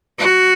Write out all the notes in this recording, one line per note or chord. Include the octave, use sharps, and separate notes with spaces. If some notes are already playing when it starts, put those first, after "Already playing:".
F#4